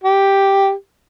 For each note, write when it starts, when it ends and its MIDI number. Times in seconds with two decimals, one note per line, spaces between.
0.04 0.71 67